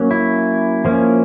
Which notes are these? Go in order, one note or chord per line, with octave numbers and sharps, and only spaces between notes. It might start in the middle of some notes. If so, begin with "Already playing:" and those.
Already playing: F#3 A#3 C#4
E4
F3 A#3 C#4